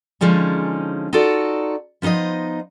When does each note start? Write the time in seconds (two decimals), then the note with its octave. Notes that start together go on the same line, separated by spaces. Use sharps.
0.21 D3 F3 G#3 C#4 D#4
1.13 D#4 F4 F#4 A4 D5
2.02 F3 B3 D#4 C5 D#5